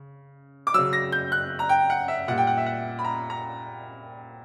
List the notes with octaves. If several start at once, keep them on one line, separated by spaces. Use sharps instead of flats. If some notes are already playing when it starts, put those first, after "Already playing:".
Already playing: C#3
D6
C#3 F#3 E6
A#6
G6
F#6
A#5
G5
F#5
E5
A#2 G3 F#5
G5
F#5
E5
F#5
B5
A#5
A#5